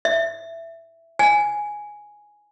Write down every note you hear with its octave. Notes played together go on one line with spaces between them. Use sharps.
E5
G#5